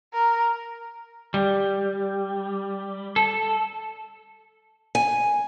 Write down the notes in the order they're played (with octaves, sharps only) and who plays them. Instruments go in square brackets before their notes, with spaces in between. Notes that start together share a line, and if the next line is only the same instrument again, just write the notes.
[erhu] A#4
[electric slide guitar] G3
A4
[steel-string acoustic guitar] G#5